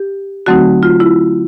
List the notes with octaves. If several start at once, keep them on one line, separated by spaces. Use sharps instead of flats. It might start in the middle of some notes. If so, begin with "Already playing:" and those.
Already playing: G4
D3 F#3 A3 C4 D#4 F#4
F4
E4